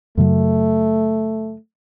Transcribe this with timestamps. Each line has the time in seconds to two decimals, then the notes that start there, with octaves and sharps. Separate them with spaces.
0.17 F#2 C#3 F#3 A3